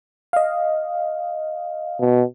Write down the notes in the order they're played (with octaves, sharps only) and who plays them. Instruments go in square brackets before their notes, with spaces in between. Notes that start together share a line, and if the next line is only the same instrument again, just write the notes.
[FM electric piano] D#5 F5
[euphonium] B2